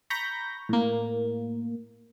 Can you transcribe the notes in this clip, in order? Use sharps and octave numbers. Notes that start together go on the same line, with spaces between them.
A#5 B5 C#6 G6 A#6
A2 A#3